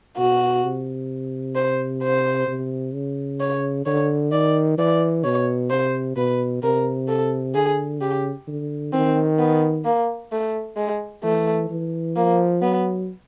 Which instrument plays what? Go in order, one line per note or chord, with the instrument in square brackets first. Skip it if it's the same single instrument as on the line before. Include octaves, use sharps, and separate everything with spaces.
[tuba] B2 [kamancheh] F#4
[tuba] C3
[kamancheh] C5
C5
[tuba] C3
C#3
[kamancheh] C#5
[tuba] D3 [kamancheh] C#5
[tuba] D#3 [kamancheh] D5
[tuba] E3 [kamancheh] D5
[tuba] B2 [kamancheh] C#5
[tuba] C3 [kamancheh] C5
[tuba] B2 [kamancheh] B4
[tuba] C3 [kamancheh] A#4
[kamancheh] A4
[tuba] D3 [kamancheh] G#4
[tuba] C#3 [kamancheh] G4
[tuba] D3
[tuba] D#3 [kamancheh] C4
[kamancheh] B3
A#3
A3
G#3
[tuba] E3 [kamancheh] A3
[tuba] E3
[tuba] F3 [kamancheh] A#3
[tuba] F#3 [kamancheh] B3